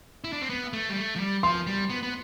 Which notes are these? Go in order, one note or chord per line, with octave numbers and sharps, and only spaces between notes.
E4
D4
C4
B3
A3
G3
A3
F3
G3
F3 C6
G3
B3
B3